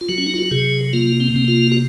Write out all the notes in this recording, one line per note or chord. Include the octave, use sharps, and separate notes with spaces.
F4
F#3 F#4
C#4
D#4
F4
F#4
C3 G#4
A#3 F4
C4
C3 C4
F4
F#4